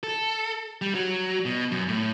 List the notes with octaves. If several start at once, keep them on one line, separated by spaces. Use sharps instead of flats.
A4
G3
F#3
B2
F#2
A2